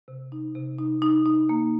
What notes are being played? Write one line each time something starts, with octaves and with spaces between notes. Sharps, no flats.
C3
D#4
C3
D#4
D#4
D#4
A#3